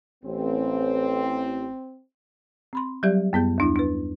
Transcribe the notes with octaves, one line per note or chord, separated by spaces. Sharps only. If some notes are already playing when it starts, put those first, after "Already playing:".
A1 C4
C4 B5 C6
F#3 G3 G4 D5 E5
F#2 B3 G#4 G6
D#2 D4 E4
D4 B4